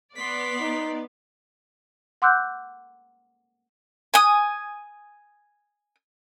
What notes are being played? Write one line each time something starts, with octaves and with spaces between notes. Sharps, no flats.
B3 D5 C6 B6
D#4
F#5 C6 D6 E6 F#6 G6
G#5 D#6